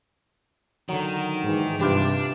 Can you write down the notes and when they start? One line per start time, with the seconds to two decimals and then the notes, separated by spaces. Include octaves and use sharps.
0.89 D3 D#3 F#3
1.44 G#2 E3
1.80 G2 C3 D4 F4 G4 B4